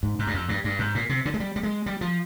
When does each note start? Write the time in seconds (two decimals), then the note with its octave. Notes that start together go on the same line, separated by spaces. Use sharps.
0.03 G#2
0.19 G#2
0.27 G2
0.34 F2
0.49 G2
0.64 G2
0.79 G#2
0.95 A#2
1.09 C3
1.25 D3
1.34 G#3
1.40 G3
1.56 G3
1.63 G#3
1.86 G3
2.01 F3